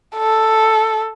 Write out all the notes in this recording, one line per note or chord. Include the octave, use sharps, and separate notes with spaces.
A4